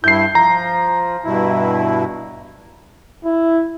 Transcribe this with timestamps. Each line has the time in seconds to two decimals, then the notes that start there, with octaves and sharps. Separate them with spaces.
0.04 G2 E4 G6 C7
0.35 F3 A#5
1.25 G2 B2 E4
3.25 E4